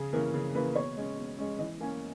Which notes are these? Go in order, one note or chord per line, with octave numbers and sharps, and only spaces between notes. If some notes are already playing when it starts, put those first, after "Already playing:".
Already playing: C#3 G#4
E3 A#3 C#4 A#4
C#3 G#4
E3 A#3 C#4 B4
B2 C#5
G#3 C#4
B2
G#3 C#4
E3 D#5
A#3 C#4 G#5